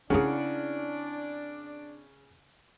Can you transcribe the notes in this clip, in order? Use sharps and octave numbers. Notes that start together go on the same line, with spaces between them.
C#3 C4 D4 E4 G#4 A#4 D5 F#5